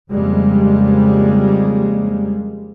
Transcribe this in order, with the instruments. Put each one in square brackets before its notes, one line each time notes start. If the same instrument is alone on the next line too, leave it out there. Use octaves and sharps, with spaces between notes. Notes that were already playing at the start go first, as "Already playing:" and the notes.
[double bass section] F2 C#3 G3 G#3 A#3